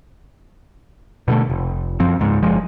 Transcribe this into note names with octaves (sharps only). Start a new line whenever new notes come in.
B2 D3 F#3 A3
F1
F#2 F3 C4
C#2 G#2
F#1 F3 G#3